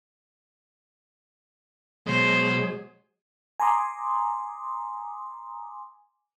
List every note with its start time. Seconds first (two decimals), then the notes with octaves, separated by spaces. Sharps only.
2.07 B2 F#3 G#3 G#4 C5
3.60 G#5 A#5 C6 D6 D#6